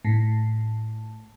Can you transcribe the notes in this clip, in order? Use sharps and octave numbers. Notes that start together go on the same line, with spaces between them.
A2